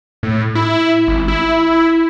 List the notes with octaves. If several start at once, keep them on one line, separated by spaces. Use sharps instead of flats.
A2
E4
G#1
E4